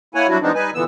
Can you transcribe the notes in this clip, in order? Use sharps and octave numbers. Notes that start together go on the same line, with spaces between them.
A#3 E4 C#5 F#5 G#5
F#3 G3 D4 E4 F#4
E3 G#3 B3 C4 D4 D#4
G3 D#4 B4 G#5
A#2 D3 E3 B3 E6